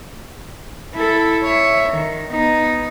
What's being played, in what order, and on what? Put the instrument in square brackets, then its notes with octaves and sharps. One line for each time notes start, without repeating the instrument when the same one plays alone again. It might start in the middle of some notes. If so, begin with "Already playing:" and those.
[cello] E4 A4
C#5 E5
D#3
B3 D#4